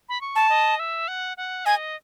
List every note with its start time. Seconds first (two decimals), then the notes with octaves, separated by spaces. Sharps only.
0.09 B5
0.21 C#6
0.36 A5
0.49 D#5
0.79 E5
1.08 F#5
1.37 F#5
1.66 D#5 G#5